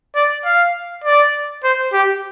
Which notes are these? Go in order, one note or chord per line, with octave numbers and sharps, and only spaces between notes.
D5
F5
D5
C5
G4